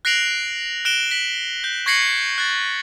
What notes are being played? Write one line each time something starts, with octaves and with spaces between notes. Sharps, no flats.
F#6 A#6 C7 D7 F7 F#7
F#6 D7 E7 G7
B6 F#7
G6
C#6 G#6 A#6 C7 C#7 F#7
F#6 A6